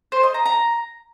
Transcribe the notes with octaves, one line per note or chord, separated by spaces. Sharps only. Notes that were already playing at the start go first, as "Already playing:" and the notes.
C5
D#5
A#5
A#5